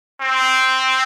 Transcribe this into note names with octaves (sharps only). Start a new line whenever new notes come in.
C4